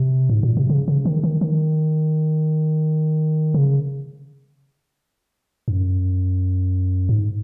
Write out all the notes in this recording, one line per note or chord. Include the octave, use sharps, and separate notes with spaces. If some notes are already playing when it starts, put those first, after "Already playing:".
Already playing: C3
G#2
A#2
C3
C#3
C#3
D#3
D#3
D#3
C#3
F#2
G#2